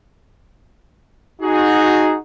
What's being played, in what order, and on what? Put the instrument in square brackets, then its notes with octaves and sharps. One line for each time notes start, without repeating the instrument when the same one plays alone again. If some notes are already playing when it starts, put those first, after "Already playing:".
[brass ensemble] D#4 F#4 G#4